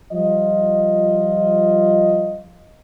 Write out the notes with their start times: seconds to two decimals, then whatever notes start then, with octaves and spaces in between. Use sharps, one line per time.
0.12 F3 G3 F4 D#5